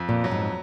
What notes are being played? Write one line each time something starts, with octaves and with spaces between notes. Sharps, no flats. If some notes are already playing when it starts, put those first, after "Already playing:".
Already playing: F2
A#2
F#3
G#2